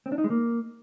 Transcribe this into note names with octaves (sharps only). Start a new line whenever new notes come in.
C4
D4
D#4
G#3
A#3